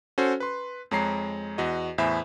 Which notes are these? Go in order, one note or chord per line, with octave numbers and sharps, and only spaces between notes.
C#4 F#4 A4 C5
B4 C6
F2 G#3 C#5 A#5 C7
E2 F#4 D#5
E2 A2 C5 E5 G#5 B5